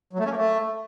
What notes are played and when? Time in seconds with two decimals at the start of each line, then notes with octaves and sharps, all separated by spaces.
0.13 F#3
0.19 A3
0.25 C#4
0.31 A#3
0.37 A3